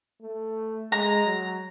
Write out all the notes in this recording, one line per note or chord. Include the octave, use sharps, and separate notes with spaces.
A3
G#3 A#5
F#3